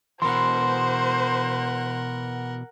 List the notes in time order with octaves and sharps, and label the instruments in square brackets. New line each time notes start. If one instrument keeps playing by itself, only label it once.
[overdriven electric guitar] B2 E3 [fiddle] A#4 F#5 [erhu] C5 [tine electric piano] C6